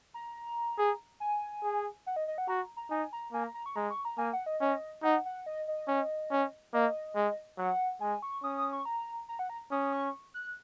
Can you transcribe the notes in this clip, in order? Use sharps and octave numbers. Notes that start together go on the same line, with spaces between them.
A#5
G#4
G#5
G#4
F#5
D#5
D#5
F#5
F#4 A#5
A#5
D#4 G#5
A#5
A#3 G#5
A#5
A#5
C#6
G#3 A#5
C#6
A#5
A#3 G#5
F#5
D#5
C#4 D#5
D#4 F#5
F#5
D#5
D#5
C#4
C#4
A#3 D#5
G#3
F#3 F#5
G#3 G#5
C#6
C#4 D#6
D#6
C#6
A#5
A#5
F#5
A#5
C#4 D#6
C#6
F#6